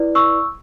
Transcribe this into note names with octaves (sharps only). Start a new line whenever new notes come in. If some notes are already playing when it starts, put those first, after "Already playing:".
Already playing: E4 B4 D5
C#6 E6